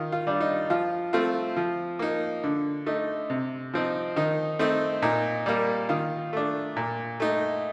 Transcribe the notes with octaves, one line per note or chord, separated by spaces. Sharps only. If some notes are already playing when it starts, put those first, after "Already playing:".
Already playing: D#3 F4
F4
G3 D4
D#4
F3 F4
A3 C4 F4
F3
A#3 D#4
D3
A3 D#4
C3
F3 C4 D#4
D#3 D#4
A3 C4 D#4
A#2 D#4
G3 A#3
D#3 F4
A3 D4
A#2
A3 D#4